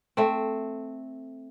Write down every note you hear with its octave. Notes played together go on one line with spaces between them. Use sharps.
A3 C4